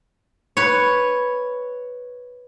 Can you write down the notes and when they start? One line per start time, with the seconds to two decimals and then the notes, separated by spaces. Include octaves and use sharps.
0.57 B4 C#5